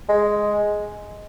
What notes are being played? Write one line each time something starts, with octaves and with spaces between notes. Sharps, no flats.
G#3